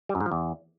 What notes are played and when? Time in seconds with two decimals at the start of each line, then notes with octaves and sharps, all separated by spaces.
0.09 G3
0.15 F#2
0.20 G#2
0.26 F3
0.32 E2